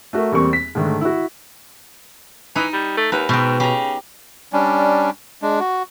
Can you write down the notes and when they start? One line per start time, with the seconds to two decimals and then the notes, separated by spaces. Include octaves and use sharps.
0.13 A3 F#4 A#4 E5
0.32 E2 G3 A#3 C4 C#6
0.53 B6
0.75 G#2 D3 D#3 G#3 A3
1.01 E4 F#4
2.56 E3 D#4
2.73 G3
2.97 A3
3.12 D#2 B4 A#5
3.29 G#2 B2 G5
3.60 C#3 G4 A#5
4.53 G3 C#4 D4
5.42 G#3 D4
5.60 F#4